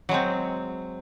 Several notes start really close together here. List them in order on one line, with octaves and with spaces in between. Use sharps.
F#3 G#3 C4